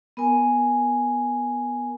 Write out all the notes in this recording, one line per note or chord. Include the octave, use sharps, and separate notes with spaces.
B3 A#4 G#5